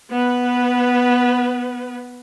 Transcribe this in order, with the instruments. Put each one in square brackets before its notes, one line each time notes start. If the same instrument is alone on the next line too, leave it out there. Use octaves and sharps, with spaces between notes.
[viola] B3 B4